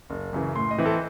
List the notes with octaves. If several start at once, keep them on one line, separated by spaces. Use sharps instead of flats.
F#1
F#2 C#3 E3
A2 C6
D#5
E3 C4 E4
A4